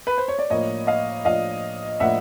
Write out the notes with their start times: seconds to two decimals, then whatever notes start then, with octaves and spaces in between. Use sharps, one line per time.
0.07 B4
0.18 C5
0.28 C#5
0.39 D5
0.50 A2 F3 A#3 D4 C#5 D#5
0.87 D#5 F5
1.25 A2 F3 A#3 D4 D#5 F5
2.00 A2 F3 A#3 D4 E5 F#5